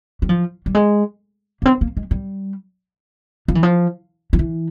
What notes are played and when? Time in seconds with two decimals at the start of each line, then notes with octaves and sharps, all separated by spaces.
0.22 G3
0.29 F3
0.66 G3
0.75 G#3
1.62 A#3
1.66 C4
1.81 A#3
1.97 G#3
2.11 G3
3.48 F3
3.55 E3
3.63 F3
4.33 F3
4.39 E3